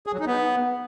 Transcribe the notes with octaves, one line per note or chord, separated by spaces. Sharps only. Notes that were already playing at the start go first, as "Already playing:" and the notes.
G#4
F#3
D#4
B3